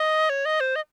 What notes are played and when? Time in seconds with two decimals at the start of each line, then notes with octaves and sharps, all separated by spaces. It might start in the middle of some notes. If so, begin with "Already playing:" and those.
Already playing: D#5
0.30 C#5
0.45 D#5
0.60 C5
0.76 D#5